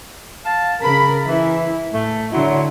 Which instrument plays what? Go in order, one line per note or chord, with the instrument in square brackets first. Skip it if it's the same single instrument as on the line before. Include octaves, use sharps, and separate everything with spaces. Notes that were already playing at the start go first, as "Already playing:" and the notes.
[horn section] F5 A5
[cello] C#3 A#4 [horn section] B5
[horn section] E3 [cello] E4
[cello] A2 [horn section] A3
[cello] D3 E4 [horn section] F#3 C6